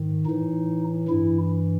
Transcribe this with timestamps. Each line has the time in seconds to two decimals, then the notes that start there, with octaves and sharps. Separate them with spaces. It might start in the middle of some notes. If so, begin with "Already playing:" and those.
Already playing: G#2 D#3
0.26 A2 E3 D#4
1.08 G2 E3 E4